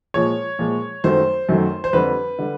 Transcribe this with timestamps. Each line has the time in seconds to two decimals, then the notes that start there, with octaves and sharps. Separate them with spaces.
0.14 A#2 F3 G#3 C#5
0.59 A#2 F3 G#3
1.04 F#2 D#3 F#3 A3 C5
1.49 F#2 D#3 F#3 A3
1.84 C5
1.93 F2 D3 G3 B4
2.39 D3 G3